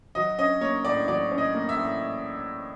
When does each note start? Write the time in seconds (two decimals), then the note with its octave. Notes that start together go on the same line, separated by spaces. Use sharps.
0.15 F#3 D#5
0.39 C#4 D#5
0.61 A#3 C#5
0.85 A2 D5
1.08 F#3 D5
1.31 C#4
1.38 D#5
1.54 A#3
1.69 E5
1.77 A2